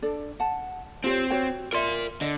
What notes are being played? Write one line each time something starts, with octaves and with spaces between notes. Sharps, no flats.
D4 A4 D5
F#5 A5
C4 F4 G4 C#5
F#4 C#5 G5
F4 A#4 D5 E5 C6
D3 D5 D#5